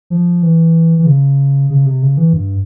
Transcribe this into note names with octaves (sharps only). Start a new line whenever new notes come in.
F3
E3
E3
C#3
C#3
C3
C#3
E3
G2